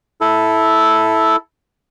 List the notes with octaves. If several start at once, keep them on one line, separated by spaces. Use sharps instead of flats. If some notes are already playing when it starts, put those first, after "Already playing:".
E4 A4